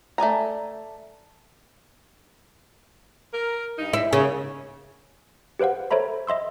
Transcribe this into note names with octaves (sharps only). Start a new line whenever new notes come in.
A3 D5 G#5 A#5
A#4
G2 D#4
E4
G#2 C#3 A#3
G4 B4 C5 F5 F#5
A4 C5 C#5 E5 A#5 B5
D#5 E5 C6 E6